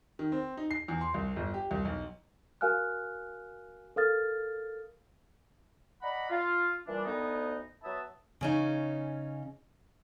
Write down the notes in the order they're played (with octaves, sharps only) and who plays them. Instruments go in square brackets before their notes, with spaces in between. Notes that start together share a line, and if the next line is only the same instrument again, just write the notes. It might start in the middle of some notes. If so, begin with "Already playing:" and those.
[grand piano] D#3
C4
D#4
C7
E2
C6
C2
G1
G4
C2
B1
[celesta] F#4 A#4 F5 G#5 F6 F#6
A4 A#4 F5 D#6 F6 A6
[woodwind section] D5 D#5 F#5 A#5 B5
F4
A#2 E3 G3 D4
D2 B3 D#4
F#3 B3 B4 E5 A5 D#6
[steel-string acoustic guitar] C#3 C#4 D#4